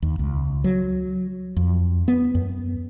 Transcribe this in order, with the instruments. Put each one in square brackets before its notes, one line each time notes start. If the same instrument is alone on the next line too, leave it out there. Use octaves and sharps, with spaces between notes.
[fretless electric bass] D#2
C#2
F#3
F2
B3
F#2